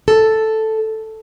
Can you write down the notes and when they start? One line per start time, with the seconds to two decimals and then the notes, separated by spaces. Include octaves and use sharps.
0.08 A4